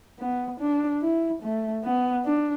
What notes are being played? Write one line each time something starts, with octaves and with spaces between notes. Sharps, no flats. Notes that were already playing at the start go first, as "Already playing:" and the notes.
B3
D4
E4
A3
B3
D4